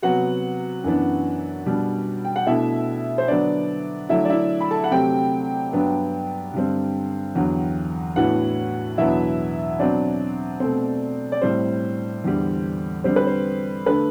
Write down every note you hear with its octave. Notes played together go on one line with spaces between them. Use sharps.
C3 F#3 B3 F#4 F#5
F#2 E3 B3 D4
B2 G3 D4
G5
F#5
B2 A3 D4 E4 E5
C5
D3 F#3 B3 D4 D5
D3 F#3 A3 D4 E4 E5
D5
E4 E5
B5
A4 A5
F#5
C3 F#3 A3 C4 G4 G5
G2 F#3 B3 D4
G2 D3 G3 C4
E2 D3 F#3
A2 E3 B3 D4 F#4 F#5
E2 B2 F#3 B3 D4 E4 E5
B2 F#3 C4 D4 D5
B2 A3 C4
D5
A2 G3 C4 C5
E2 D3 G3
D3 G3 C4 C5
B4
C5
D3 A3 D4 B4